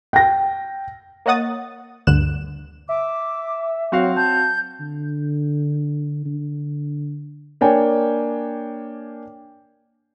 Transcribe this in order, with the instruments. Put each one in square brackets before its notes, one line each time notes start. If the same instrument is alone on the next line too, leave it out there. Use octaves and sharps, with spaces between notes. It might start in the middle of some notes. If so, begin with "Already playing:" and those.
[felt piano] G5 A#6
[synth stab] A#3 C#5 D#5 F#5 D#6 A6
D2 G2 D3 F#6 E7
[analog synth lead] E5 [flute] D6
[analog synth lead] F#3 [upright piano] C4 F#4 F5
[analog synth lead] A5 [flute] G6
[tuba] D3
D3
[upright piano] A#3 D4 C#5 G5 G#5